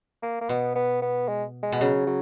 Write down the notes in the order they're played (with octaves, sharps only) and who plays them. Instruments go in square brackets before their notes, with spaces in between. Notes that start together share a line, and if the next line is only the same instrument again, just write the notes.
[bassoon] A#3
A#3
[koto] B2 [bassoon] B3
[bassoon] B3
B3
G#3
G#3
[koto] B2
[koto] C#3 [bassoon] F#3
[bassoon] F#3